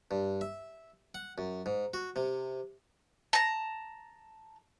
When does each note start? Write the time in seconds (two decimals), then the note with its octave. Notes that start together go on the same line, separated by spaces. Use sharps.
0.11 G2
0.41 E5
1.15 F#5
1.38 F#2
1.66 G#2
1.94 F#4
2.16 C3
3.33 A5 A#5